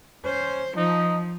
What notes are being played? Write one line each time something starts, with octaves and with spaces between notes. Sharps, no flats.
C#4 C5
F3 D#4